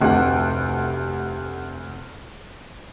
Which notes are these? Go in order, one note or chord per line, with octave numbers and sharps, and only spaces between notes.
F1 D2 C3 G4 F#5